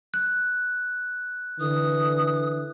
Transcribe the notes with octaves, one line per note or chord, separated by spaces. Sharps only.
F#6
D3 E3 D#6